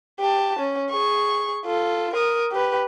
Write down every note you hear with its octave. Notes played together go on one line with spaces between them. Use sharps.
G4 A5
C#4
G#4 C#6
F4 A4
A#4 D#6
G4 B4